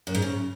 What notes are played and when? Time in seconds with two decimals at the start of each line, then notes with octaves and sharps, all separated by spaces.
0.07 F#2
0.15 G#2
0.22 C#3